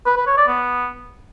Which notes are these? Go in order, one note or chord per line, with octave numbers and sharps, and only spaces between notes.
B4
B4
C#5
D5
B3